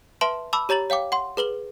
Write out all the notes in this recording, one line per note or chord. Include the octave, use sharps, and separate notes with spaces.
B4 E5 A5 C6 D7 F#7
A5 B5 D6 E6
G4 C#5 A#5 A6 F#7
C#5 F5 G5 D6
F#5 C6
G#4 B4 F#7 G7